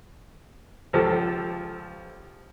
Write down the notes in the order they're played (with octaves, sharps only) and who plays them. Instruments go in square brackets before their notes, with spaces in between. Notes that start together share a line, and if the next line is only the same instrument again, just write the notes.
[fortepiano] C#2 F3 G4 A4